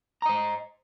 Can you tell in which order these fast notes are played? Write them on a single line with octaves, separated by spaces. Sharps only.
A#5 D#5 C5